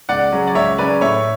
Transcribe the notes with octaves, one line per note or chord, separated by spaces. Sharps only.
C#2 D5 F#5
C#3 F#3 C#4
D5
C#2 C#5 E5
C#3 F#3 C#4 B4 D5
A2 C#5 E5